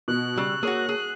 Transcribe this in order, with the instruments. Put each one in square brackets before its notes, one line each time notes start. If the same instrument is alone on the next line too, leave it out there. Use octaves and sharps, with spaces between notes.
[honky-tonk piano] B2 [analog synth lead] F#6
[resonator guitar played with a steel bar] C#3 [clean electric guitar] G3 [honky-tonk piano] C#6 E6
[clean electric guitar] A#3 C#5 [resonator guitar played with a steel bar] F#4 G#4
[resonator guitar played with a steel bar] G#4